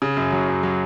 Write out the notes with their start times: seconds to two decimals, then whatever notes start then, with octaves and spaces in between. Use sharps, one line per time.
0.02 C#3
0.17 F#2
0.32 F#3
0.48 F#2
0.63 F#3